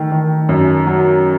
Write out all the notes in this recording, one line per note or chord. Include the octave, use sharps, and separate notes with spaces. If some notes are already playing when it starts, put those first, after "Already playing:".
Already playing: D#3 A3
D#3
F#2
F#3